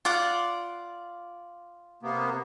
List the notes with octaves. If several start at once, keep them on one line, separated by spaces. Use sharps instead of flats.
F4 D5 F#5
C3 A#3 B3